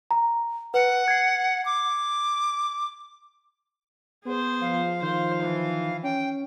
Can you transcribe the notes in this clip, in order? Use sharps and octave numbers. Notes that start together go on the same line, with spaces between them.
A#5
B4 F#5
G#6 C7
D6
B3 G#4 C5
F3 F5
D#3 C5
E3
C#4 G5